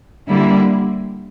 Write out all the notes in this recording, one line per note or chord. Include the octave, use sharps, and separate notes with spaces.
D3 G3 A#3 E4